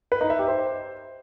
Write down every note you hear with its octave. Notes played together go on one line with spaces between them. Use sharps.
B4
D#4
E5
G4
C5